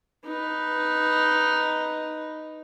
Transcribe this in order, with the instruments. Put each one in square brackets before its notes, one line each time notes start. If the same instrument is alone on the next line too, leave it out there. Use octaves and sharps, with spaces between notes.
[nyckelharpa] D#4 B4